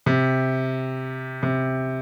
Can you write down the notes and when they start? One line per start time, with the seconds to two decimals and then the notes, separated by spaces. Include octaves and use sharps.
0.06 C3
1.43 C3